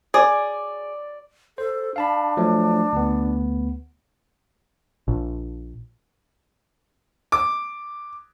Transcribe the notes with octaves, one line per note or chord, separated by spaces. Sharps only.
G#4 D5
A4 C5
D4 F5 A5 B5
F3 F#3 A3
D2 B3
A#1
D6